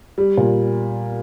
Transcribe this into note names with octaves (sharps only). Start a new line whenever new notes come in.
G3
A#2